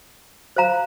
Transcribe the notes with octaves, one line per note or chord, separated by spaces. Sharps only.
C5 F5 A#5